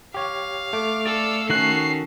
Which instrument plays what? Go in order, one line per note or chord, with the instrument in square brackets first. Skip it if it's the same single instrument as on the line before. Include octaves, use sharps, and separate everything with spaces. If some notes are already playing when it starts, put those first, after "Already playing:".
[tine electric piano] G4 C#5 [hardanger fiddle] F5
[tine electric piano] A3 [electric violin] D6
[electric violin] A4 E6 [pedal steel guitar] D5
[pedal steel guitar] D#3 F#4 F#6 [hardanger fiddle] C#4 A4 [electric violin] C7